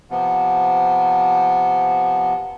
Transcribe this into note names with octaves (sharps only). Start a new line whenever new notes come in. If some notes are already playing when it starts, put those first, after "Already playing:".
C3 F3 B3